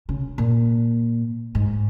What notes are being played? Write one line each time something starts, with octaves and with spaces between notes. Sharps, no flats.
C#3
A#2
G#2